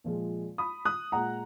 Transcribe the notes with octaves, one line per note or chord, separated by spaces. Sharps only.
A#2 F3 G#3
B5 D#6
D#6 F#6
A#2 G#3 F#5 A#5